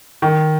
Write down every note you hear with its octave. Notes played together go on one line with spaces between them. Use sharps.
D#3